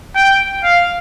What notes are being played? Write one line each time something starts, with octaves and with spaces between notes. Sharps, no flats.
G5
F5